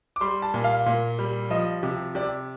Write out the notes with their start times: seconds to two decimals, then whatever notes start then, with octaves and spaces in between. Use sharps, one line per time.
0.16 D6
0.21 G3 C6
0.42 A5
0.54 A#2
0.64 F5
0.86 A#2
1.19 G3
1.50 F3 D#5
1.83 C3
2.15 C3 D5